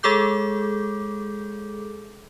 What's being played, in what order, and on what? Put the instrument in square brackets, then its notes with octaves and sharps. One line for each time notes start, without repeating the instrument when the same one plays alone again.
[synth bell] G#3 G#4 A4 D6 G6